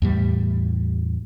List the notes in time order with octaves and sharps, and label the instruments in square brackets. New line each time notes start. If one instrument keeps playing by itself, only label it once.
[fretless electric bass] E2 A2 G3